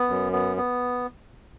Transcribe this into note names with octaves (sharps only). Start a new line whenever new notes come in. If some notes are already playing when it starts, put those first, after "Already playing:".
Already playing: B3
F#2
B3
B3